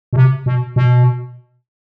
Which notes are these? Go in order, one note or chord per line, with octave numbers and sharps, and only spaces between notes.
B2
C3
B2
B2